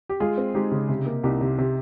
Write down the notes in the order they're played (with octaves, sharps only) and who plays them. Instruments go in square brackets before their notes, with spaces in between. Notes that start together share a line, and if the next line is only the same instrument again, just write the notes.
[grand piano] G4
[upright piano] G#3 [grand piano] F4 G#4
[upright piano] C4
[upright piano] G#3 [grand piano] D#4 G4
[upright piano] C#3
C3
A#3
[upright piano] C2 [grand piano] D#4 G4
[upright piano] C3
C3